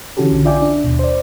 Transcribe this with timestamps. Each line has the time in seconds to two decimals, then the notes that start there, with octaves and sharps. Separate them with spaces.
0.17 D3 E3 C#4 F#4 G4 A4
0.32 B1 D3
0.45 F4 D5 E5 G5 G#5 D6
0.62 D4
0.84 D#2 B2
0.99 C5 D5